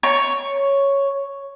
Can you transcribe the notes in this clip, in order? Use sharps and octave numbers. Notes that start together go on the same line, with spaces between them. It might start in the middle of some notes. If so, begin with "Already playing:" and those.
C#5